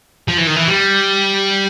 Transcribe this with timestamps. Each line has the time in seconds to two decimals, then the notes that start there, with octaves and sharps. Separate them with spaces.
0.28 F3
0.38 E3
0.47 D#3
0.56 E3
0.68 G3